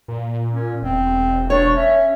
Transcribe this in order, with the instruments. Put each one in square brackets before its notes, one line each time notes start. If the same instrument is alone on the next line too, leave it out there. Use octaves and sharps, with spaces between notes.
[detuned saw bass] A#2
[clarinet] C#4
[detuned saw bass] E1 [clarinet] C4
[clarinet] D4 [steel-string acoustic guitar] C#5 [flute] C#6
[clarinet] C#4 [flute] E5